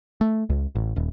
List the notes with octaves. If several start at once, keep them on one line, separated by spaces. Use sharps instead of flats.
A3
C#2
A1
D#1